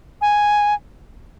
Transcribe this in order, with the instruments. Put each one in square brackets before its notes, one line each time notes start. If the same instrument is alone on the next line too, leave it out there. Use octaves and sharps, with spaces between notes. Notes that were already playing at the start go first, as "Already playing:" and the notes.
[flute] G#5